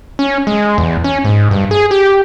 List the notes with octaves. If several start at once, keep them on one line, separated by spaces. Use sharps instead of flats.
C#4
G#3
E2
C#4
G#2
G2
G#4
G4